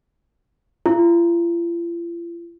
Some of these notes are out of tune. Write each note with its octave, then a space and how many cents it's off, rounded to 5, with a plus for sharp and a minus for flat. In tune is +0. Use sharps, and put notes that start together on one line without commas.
F4 -45